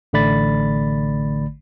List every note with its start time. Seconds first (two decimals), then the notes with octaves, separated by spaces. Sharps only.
0.13 A1 D3 A3 D5 B5 A6